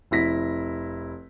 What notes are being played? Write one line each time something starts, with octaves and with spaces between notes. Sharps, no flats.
F1 E4 A#6 B6